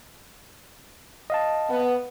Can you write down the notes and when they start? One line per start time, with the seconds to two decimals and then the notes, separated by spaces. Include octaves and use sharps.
1.30 D#5 F5 A5
1.70 B3